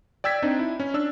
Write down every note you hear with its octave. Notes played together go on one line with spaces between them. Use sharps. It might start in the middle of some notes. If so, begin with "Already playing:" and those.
D5 G5 E6 G#6 B6
C4 D4 D#4
E4
C#4
D4 E6